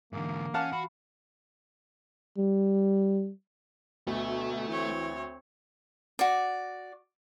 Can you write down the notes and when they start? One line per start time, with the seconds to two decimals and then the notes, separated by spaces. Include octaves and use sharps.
0.13 G#2 D3 E3 A#3
0.54 C#4 F5 F#5 A5
0.72 F#4 B5
2.38 G3
4.07 D2 B2 A3
4.68 E3 C4 C#5
6.19 F#4 D5